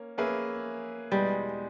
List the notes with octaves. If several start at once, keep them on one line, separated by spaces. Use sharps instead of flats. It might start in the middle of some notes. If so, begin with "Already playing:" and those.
Already playing: A#3 C#4
A#3 C#4 G#4 B4 E5
E2 B2 G3 G#3